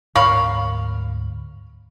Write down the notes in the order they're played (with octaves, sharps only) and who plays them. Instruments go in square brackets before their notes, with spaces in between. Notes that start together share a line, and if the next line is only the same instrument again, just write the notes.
[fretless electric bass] D2 G#2 C#4 [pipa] A#4 C#5 B5 [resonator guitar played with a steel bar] F5 [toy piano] C#6